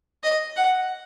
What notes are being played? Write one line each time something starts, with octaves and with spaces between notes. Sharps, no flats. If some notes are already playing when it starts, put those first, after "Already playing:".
D#5
F#5